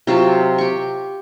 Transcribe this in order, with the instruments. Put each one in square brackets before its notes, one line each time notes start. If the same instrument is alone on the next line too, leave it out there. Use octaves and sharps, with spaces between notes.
[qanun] C3 F#3 F4 A5
G4 C#6